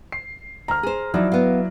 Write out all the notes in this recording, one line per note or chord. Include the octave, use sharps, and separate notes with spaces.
C7
D2 A#5 F6
G#4 C5
F3 F#3 D#4 E4 D5
B3 F5